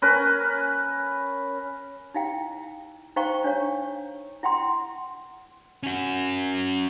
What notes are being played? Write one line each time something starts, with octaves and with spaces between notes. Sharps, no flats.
C#4 A#4 B4
D#4 E4 F5 G5
D#4 C5 F5 G5 A#5 C#6
D4 C#5 F5
E4 F#5 G5 C6
C#4 F#4